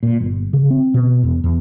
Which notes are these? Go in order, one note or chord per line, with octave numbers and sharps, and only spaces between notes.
A#2
G1
C#3
C4
B2
E2
E2